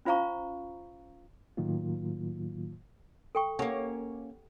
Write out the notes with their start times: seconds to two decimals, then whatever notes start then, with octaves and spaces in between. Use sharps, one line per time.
0.05 C#4 F4 C5 F5 A#5 C#6
1.57 A2 D#3 F#3 A#3 F4
3.35 A4 G5 C#6
3.59 A#3 C#4 G4 A4 F#5